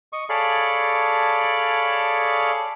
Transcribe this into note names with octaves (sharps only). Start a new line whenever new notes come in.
D#5 C#6
G#4 A4 C#5 D5 F5 B5